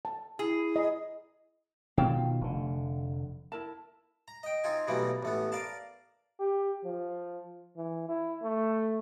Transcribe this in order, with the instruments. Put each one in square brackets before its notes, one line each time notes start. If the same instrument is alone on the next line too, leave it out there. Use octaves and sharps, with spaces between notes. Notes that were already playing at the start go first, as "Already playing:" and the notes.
[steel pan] A5
[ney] E4 [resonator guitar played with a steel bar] G#4
[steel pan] D#5
[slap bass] B2 D#3 F3 [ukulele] F5 G5 A5
[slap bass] F1 D3
[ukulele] E4 A#4 A5
[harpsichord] A#5
D#5 G5
C4 D#4 F4 G#5
B2 E3 F#3 G3 A3 A#3
A1 A3 B3
A#4 D5 F5 A5
[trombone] G4
F3
E3
E4
A3